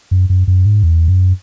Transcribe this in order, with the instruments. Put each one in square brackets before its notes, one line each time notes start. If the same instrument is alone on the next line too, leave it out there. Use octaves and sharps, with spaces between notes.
[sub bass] F#2
F#2
F#2
G#2
E2
F#2